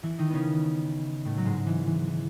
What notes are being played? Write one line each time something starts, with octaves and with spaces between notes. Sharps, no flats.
E3 E4
D#3 D#4
C#3 B3 C#4
A2 A3
F#3
G#2 G#3
E3
E3
E3